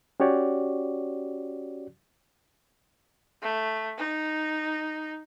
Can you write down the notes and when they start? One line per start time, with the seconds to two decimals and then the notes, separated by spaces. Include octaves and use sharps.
0.20 C#4 F#4 G4 C#5 D5
3.42 A3
3.98 D#4